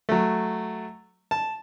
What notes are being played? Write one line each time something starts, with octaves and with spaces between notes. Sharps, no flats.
F#3 A3
A5